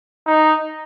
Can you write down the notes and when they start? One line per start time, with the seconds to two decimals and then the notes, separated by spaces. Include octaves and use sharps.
0.26 D#4